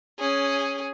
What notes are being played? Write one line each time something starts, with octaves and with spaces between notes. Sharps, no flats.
C#4 G#4